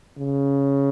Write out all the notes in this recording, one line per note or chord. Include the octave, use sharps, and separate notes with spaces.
C#3